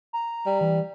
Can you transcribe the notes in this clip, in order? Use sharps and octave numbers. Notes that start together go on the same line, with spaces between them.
A#5
G3
E3